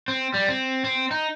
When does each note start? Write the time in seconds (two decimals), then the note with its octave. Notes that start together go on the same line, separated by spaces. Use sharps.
0.08 C4
0.34 G3
0.48 C4
0.84 C4
1.11 D#4